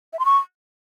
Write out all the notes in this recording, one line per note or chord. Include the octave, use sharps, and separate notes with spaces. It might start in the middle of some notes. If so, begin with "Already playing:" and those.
E5
C6
C#6